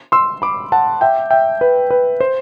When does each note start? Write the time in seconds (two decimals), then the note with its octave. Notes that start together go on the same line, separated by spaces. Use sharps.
0.12 C6 E6
0.42 B5 D6
0.72 F#5 A5
1.01 E5 G5
1.31 E5 G5
1.61 B4
1.91 B4
2.20 C5